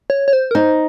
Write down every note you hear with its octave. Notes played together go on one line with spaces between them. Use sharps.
C#5
C#5
C5
A#4
D#4 C5